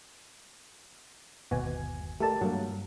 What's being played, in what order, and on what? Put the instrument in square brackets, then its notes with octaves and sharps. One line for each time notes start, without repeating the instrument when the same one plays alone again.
[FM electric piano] G1 D#2 G#5 [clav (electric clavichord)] B2 F#4
[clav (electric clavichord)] A3 A4 D5 [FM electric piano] G4 A#4 A5
[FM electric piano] G2 [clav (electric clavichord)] F#3 A3 A#3